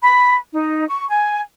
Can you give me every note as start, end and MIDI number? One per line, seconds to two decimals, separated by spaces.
0.02 0.35 83
0.53 0.88 63
0.89 1.07 85
1.10 1.40 80